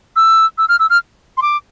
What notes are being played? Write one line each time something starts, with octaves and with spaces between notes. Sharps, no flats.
E6
E6
F6
E6
F6
C6
D6